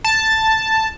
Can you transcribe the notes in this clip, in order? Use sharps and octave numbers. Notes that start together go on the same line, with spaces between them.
A5